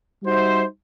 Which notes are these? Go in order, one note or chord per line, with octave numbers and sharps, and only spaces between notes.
G3 D#4 F#4 C5 E5